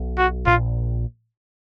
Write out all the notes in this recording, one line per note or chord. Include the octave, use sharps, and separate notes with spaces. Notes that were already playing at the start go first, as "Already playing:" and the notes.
Already playing: B1 B2
F#4
A#1 A#2 F4